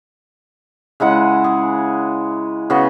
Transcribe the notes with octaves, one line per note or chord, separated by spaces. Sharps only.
C#3 G#3 E4 F#5
G#4
C#3 B3 F#4 C6